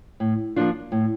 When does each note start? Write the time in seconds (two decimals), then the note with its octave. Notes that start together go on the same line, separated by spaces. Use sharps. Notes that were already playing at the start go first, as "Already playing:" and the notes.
0.20 A2
0.56 F3 A#3 D4 F4
0.92 A2